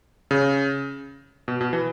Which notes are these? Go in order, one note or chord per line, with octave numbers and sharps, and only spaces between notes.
C#3
B2
B2
E3